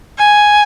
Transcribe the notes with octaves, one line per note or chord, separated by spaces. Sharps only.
G#5